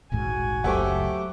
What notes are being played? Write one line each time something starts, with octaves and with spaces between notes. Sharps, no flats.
D#1 A1 G#2 F#4 G#5
F#1 C#2 F#3 A3 G4 C5 F#5